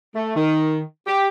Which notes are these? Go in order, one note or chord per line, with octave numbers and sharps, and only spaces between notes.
A3
D#3
G4